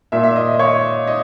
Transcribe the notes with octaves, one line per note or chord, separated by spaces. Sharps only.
A#2 E5
E5
D#5
D#5
C#5
D#5